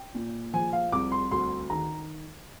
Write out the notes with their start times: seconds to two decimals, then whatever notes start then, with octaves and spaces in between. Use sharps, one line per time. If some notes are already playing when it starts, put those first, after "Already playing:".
Already playing: G5
0.14 A#2
0.54 F3 G#5
0.73 F5
0.92 C2 D6
1.12 C6
1.31 D2 C6
1.70 D#3 A#5